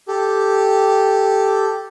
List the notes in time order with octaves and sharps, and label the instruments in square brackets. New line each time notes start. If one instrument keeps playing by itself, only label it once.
[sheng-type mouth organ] G4 A4